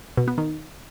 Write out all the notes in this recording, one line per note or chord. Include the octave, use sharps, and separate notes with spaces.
B2
B3
D#3